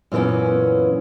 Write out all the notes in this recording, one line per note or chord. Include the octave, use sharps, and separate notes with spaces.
F#2 A#2 E3 B3 C#4